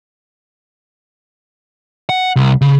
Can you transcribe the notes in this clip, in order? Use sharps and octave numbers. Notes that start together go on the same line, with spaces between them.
F#5
C2
C#3